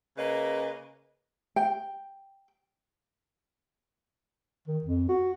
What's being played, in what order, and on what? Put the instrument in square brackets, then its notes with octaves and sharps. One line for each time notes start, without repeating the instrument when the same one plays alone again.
[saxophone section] C#3 A#3 B4 D#5
[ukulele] G5
[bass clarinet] D#3
F2
F#4